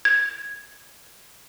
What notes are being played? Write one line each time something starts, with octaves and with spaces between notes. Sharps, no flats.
G#6